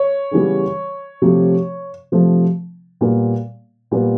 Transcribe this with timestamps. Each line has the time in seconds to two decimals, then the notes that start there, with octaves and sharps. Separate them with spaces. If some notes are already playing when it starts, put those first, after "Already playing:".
Already playing: C#5
0.31 C#3 E3 G3 B3
1.22 C3 F3 A3
2.12 C3 F3 A3
3.01 A#2 G3 B3
3.91 A#2 G3 B3